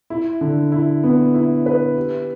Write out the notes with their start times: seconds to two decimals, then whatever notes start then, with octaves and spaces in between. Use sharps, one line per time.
0.10 E4
0.41 D3
0.72 E4
1.03 B3
1.34 E4
1.66 B4
1.97 G4